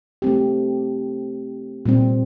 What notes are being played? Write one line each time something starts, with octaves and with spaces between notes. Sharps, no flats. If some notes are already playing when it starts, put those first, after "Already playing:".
A3 C4 G4
A#2 G3 C4